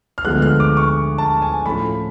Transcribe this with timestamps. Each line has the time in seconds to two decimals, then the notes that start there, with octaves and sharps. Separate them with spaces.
0.18 F6
0.24 D2 D3 F3 G#3 B3 F#6
0.42 F6
0.60 D6
0.77 C#6
1.18 A5
1.42 G#5
1.65 A2 F3 A3 C#4 B5